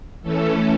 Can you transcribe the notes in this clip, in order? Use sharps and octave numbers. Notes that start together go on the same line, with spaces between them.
E3 A3 C#4 A4